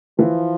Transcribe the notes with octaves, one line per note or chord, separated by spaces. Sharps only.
E3 F3